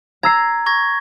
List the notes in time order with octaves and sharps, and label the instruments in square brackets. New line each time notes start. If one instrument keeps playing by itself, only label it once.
[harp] A#5 E6 C7 [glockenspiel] G#6
[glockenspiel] C#6 G#6 A#6